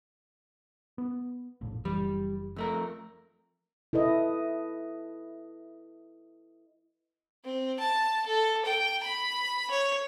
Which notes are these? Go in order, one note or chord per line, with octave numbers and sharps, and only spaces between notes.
B3
F1 A#1 A2
F#1 E3 G3
F2 A3 A#4
E4 A4 B4 D#5
C4
A5
A4
G5
B5
C#5